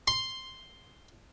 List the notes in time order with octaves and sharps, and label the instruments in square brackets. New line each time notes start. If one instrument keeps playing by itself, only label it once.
[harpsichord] C6